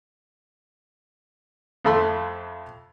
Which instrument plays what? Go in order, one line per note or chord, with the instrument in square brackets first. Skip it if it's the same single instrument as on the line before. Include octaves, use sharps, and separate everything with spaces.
[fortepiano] F2 F3 A3 B5 C6